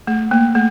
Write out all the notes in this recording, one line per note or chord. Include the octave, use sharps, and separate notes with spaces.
A3
A#3
A3